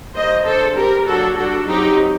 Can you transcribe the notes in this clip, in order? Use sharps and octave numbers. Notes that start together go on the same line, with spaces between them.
D#3 G3 A#3 C5 D#5
D3 A3 D4 A4 C5
G3 C4 G4 A#4
F#3 A#3 D4 F#4 A4
G3 D4 F#4 A4
F#3 C4 D#4 G4